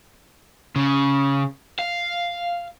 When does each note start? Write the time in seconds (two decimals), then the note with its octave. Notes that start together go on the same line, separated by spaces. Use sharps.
0.76 C#3
1.79 F5